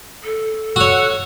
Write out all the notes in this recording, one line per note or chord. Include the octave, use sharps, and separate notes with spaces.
A4
F#4 C#5 F#5 E6 F#6